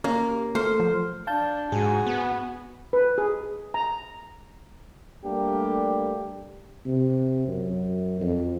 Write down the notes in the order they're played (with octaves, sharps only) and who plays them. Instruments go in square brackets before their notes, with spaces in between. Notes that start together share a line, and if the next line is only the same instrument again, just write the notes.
[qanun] A#3 [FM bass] C#4
[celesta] G4
[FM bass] A3 [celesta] A4 C6 F6 [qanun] C5
[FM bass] F3
[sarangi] D4 [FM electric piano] F5 A5 G6
[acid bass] G#2 [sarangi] F#4 [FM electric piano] G#4 [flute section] G#5
[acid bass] B3
[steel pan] B4
G#4
A#5
[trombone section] G3 A3 A#3 D4 G4
[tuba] C3
F#2
F2